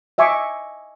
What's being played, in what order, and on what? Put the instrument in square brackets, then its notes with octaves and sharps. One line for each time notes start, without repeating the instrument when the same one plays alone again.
[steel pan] D#5 E5 G#5 C#6 D6